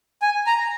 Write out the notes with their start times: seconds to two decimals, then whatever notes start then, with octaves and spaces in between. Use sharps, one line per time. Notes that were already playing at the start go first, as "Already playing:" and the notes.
0.22 G#5
0.47 A#5